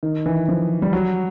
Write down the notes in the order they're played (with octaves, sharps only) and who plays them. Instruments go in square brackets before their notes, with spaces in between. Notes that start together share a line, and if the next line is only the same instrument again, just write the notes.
[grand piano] D#3
E3
F3
G3
F#3